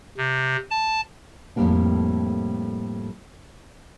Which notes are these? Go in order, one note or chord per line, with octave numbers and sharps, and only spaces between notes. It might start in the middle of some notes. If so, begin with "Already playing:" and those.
C3
A5
F2 A2 D#3 G3 A#3 D4